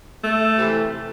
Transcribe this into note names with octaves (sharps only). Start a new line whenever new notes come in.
A3
C3 E3